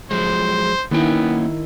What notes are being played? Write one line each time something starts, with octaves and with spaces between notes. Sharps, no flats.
F3 F#3 G#3 C5
D#3 A#3 B3 C#4 E4 G5